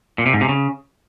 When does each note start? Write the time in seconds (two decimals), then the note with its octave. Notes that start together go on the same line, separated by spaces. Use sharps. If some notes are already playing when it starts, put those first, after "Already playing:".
0.18 A#2
0.26 C3
0.34 G#2
0.41 C3
0.49 C#3